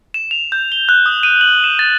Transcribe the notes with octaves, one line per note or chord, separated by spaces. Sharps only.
E7
F7
G6
G7
F#6
D#6
D#7
F#7
E7
A6